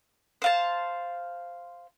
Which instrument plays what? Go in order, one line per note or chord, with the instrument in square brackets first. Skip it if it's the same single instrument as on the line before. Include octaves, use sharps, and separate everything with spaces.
[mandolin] C5 F5 A5